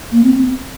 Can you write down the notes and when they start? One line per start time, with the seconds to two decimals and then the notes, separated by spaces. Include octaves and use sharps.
0.12 A#3
0.24 C4